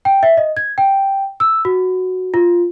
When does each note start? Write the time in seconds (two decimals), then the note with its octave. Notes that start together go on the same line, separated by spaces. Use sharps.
0.05 G5
0.23 E5
0.37 D#5
0.57 G#6
0.78 G5
1.40 E6
1.65 F#4
2.34 F4